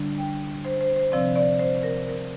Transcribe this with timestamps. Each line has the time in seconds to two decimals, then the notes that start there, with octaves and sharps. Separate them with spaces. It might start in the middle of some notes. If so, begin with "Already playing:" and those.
Already playing: D3 G3 D4
0.18 G5
0.65 C5
0.81 C5
0.96 C5
1.12 C3 F3 C4 D5
1.36 D5
1.60 C5
1.83 A#4
2.07 A#4